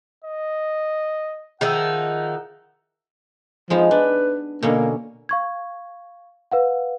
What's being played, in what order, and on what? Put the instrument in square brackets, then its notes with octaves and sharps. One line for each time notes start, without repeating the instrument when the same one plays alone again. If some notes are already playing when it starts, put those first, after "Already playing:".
[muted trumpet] D#5
[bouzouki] D#3 F3 D#4 [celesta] G#4 E5 E6 [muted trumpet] F#5
[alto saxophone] F3 [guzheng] G#3 B3 D#4
[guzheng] D4 [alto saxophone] B4
[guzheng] B2 D3 C#4 [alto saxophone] A#3
[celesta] F5 C#6 G#6
B4 F5 F#5